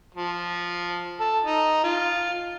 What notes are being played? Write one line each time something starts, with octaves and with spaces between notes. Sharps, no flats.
F3
A4
D#4
F4